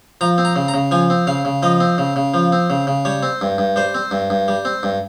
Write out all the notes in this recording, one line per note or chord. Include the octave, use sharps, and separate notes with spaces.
F3 A#5
C4
A#5
C#3
A#5
C#3
F3 G#5
C4
C#3 F5
C#3
F3 D#5
C4
C#3
C#3
F3
C4
C#3
C#3
G3 C#5
C4
G2
G2
G3 C5
C4
G2
G2
G3
C4
G2